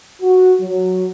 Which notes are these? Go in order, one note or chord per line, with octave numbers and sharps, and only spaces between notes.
F#4
F#3